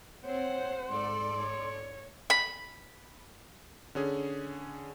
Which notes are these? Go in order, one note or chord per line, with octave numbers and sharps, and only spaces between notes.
C4 C5 C#5 F#5
G#2 A4 D5 C6
C#5
B5
D3 C#4 G#4